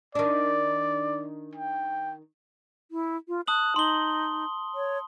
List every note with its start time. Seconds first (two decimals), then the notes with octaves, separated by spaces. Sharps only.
0.15 D#3 D4 D5
1.56 G5
2.91 E4
3.28 F4
3.47 A5 D#6 F#6 F#7
3.76 D#4 C6 G7
4.75 C#5